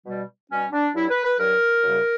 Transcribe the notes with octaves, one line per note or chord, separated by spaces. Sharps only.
B2 G3
B2 G3 C#4
D4
G2 F#3 E4
B4
B4
G2 F#3 A#4
F#2 C#3 G3